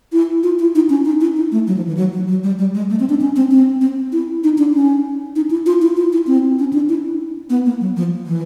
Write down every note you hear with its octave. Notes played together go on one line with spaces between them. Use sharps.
E4
F4
E4
D#4
C#4
D#4
E4
D#4
A3
F#3
F3
E3
F#3
F#3
F#3
G3
G3
G#3
A3
C4
D4
C#4
C4
C4
C4
E4
D#4
D4
C#4
D#4
E4
F4
E4
F4
E4
C4
C#4
D4
E4
B3
A#3
F#3
F3
E3